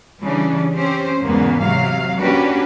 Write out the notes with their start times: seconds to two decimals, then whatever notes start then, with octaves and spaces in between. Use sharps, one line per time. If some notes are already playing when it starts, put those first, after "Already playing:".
0.21 C#3 E3 G3 C#4 D4
0.76 C4 C#4 G4 C5
1.21 E2 G#2 C#3 A#3 B3
1.61 C3 F#3 F5
2.21 A#3 C#4 D4 F#4 G4 B4